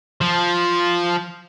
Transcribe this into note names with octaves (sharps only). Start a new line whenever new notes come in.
F3